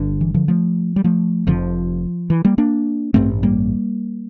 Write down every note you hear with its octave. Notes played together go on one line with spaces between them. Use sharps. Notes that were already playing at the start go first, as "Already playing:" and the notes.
Already playing: G1 G2 D3
E3
D3 F3
F3 A3
G3
F3 A3
F1 F2 D3 F3
E3
G3 A#3
A#3 D4
A1 G2 D3 A3 C4
G3 A#3